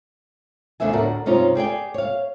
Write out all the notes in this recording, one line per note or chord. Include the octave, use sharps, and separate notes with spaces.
E2 C#3 A3 D4 E5 G#5
D2 A2 D4 F#4 A#4
G2 C3 C#4 D#4 F4
G4 G#4 D5 G5
C#5 F5